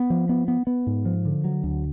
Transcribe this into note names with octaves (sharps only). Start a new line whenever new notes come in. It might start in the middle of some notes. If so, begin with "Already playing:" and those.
Already playing: B3
F3
B3
B3
B3
G#2
F3
D3
F#3
D2